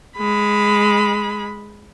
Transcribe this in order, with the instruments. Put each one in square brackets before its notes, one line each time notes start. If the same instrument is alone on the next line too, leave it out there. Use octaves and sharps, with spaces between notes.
[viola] G#3 B5